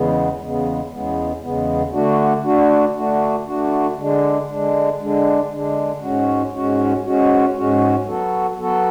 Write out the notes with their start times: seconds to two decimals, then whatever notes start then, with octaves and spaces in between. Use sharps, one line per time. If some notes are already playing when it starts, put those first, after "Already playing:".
Already playing: E2 C#3 G#3 B3
0.40 E2 C#3 G#3 B3
0.91 E2 C#3 G#3 B3
1.42 E2 C#3 G#3 B3
1.93 D3 A3 D4 F#4
2.44 D3 A3 D4 F#4
2.95 D3 A3 D4 F#4
3.46 D3 A3 D4 F#4
3.98 D3 G#3 D4
4.48 D3 G#3 D4
4.99 D3 G#3 D4
5.51 D3 G#3 D4
6.01 G#2 G#3 C#4 F#4
6.53 G#2 G#3 C#4 F#4
7.05 G#2 G#3 C#4 F#4
7.55 G#2 G#3 C#4 F#4
8.06 F#3 B3 F#4 A4
8.58 F#3 B3 F#4 A4